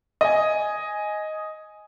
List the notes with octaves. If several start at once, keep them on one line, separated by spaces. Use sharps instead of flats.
D#5 G#5